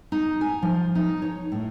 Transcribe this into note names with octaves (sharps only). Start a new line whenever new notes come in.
D#4
G#5
F3
D#4
C#5
A2